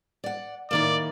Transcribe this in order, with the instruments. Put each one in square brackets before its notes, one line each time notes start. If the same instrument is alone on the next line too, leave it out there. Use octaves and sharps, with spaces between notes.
[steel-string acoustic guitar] D5 F#5
[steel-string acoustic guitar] A2 D#3 A#3 [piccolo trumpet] D5